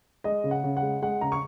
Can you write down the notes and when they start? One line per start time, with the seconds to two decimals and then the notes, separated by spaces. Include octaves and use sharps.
0.24 G#3 D#5
0.44 C#3
0.51 F#5
0.64 C#3
0.77 F#5
0.82 G#3
1.02 G#3 F#5
1.21 C#3 A#5
1.32 C#6